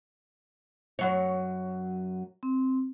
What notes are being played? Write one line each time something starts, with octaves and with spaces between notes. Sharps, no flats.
F#2 F#3 C#5
C4